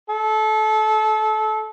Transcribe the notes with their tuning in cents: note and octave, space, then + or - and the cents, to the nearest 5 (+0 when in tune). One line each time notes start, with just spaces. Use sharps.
A4 -25